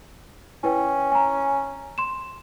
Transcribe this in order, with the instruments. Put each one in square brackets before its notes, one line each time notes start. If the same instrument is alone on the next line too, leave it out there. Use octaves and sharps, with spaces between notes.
[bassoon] C#4 [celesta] E4 B4 G5
[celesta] G#5 A#5
C6 E7